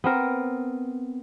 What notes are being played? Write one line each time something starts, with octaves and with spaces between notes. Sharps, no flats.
B3 C4 A#4